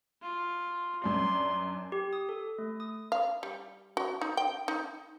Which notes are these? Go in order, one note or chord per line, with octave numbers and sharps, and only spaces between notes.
F4
F#2 D4 C6
G4
D#6
A4
A3
D#6
F5
G3
F#4
D#4
G5
D#4